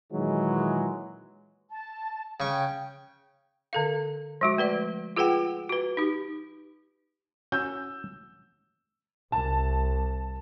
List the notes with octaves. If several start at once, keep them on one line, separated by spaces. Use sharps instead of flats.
A#2 D#3 E3 F#3 G#3
A5
C#3 G5 C#6
D3 A4 F5
F3 G#3 F#4
A3 B4 D5
F4 G#4 B4 F#5 G5
F#4 B4
D#4 G4
C#4 F#4 E6 G6
C2 A5